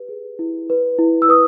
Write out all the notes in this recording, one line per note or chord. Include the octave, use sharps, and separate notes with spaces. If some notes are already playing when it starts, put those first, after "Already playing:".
Already playing: G4 B4
G#4
E4
B4
E4
E6
B4 D#6